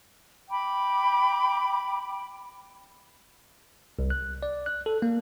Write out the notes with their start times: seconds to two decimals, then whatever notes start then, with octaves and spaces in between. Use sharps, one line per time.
0.50 G5 B5 D6
3.99 C2
4.10 F#6
4.43 D5
4.66 F#6
4.86 A4
5.02 A#3